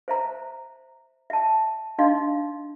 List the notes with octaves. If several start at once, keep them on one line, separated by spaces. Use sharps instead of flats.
C5 E5 A#5
E5 A5
D4 D#4 D#5 F5 C6